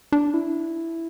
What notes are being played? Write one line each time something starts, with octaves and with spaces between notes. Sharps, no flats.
D4
E4